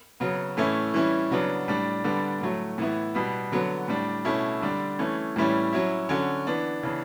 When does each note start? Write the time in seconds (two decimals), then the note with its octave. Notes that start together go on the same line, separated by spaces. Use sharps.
0.20 C#3 F#3 B3
0.57 A2 E3 A3 C#4 E4
0.94 E3 G3 C#4 E4
1.31 C#3 F#3 B3 D4
1.68 A2 G3 D4
2.04 D3 G3 B3 D4
2.41 A2 F#3 A3
2.78 A2 E3 B3 E4
3.15 B2 G3 B3
3.52 D3 F#3 B3
3.88 A2 G3 D4
4.25 B2 A3 C#4 E4
4.62 D3 G3 D4
4.99 E3 A3 C#4
5.36 A2 E3 G3 C#4 E4
5.73 F#3 C#4 E4
6.09 D3 F#3 C#4
6.47 E3 B3 D4
6.83 C#3 E3 B3 D4